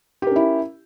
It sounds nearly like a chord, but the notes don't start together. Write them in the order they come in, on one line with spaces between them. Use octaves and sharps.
G4 A#4 C#4 E4